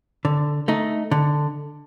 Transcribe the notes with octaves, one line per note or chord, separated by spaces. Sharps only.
D3
A3 D#4
D3